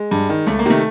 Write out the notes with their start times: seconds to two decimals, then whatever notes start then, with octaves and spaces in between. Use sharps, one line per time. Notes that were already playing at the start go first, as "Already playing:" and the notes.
Already playing: G#3
0.11 G2
0.29 D#3
0.47 C#2 A3
0.59 A#3
0.66 C3 D#3 A3